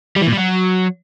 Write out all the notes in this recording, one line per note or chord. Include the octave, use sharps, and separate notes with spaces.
G3
E3
A#2
G3
F#3